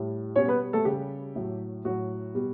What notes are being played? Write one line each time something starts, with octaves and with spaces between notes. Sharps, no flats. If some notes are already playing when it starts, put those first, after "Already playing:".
Already playing: A2 G3
B2 G3 C#4 C#5
B3 B4
A3 A4
C#3 G3 G4
A2 F#3
A2 F#3 F#4
B2 G3